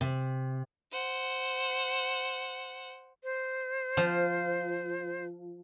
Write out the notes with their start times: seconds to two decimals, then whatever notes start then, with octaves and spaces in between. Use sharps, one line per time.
0.01 C3
0.92 C5 F#5
3.24 C5
3.97 F3